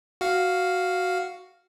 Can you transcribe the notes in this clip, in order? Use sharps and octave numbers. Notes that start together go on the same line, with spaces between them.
F#4 F5